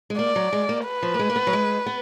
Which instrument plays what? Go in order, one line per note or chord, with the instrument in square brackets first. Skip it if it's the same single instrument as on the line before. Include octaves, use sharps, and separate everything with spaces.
[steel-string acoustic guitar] G#3
[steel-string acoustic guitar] A#3 [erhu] D5
[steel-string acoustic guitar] F#3
G#3
A#3
[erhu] B4
[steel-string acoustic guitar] F3
A#3
G#3
A#3
B3
F#3
G#3
B3